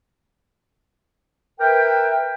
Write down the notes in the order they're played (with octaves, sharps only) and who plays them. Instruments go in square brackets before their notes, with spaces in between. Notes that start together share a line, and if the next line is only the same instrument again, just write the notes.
[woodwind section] A#4 B4 E5 G5